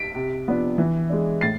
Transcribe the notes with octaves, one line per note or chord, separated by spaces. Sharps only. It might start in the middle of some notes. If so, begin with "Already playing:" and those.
Already playing: B6 D7
C3
F3 B3 D4
E3
G#3 D4
A2 A6 C7